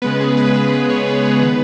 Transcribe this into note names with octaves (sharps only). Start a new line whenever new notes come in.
C#3 G#3 B3 B4
G#4
B4
B4
B4
G#4 C#5
B4
G#4
D#3 B3 B4